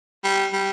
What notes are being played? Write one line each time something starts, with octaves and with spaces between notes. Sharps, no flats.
G3
G3